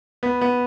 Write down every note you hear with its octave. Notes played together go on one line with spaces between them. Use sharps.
B3
B3